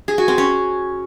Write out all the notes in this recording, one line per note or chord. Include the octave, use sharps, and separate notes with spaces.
G#4
F#4
C4
C#4